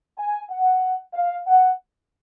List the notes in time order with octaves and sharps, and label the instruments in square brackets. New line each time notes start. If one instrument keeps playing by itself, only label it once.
[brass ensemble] G#5
F#5
F5
F#5